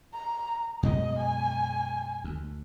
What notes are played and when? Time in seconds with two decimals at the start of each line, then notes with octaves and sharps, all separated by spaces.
0.14 A#5
0.83 F#2 B2 G#3 D#5
1.18 G#5
2.24 D2